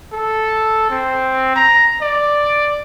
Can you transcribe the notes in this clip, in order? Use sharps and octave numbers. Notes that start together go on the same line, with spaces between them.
A4
C4
A#5
D5